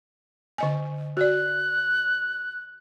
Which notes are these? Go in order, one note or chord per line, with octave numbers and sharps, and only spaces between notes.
D3 D#5 G#5
F#4 D5 F#6